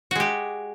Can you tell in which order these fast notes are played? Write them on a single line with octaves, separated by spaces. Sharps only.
F#4 G#3 G4